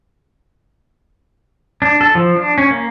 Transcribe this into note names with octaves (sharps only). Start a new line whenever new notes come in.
D4
A4
F3
D4
C#4
A#3